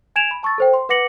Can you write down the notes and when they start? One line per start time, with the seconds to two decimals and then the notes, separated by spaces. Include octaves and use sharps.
0.16 G#5 G#6 D7 E7 F7
0.31 B5
0.43 A5 C#6 E6 A6
0.58 A4 C5 G5
0.74 C6
0.89 B4 F#5 D6 A#6 C#7 F#7